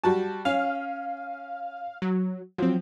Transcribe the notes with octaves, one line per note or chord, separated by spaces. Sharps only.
G3 F#4 A5
C#4 F5
F#3
F3 F#3 C4